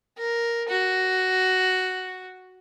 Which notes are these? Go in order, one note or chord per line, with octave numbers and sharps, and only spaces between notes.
A#4
F#4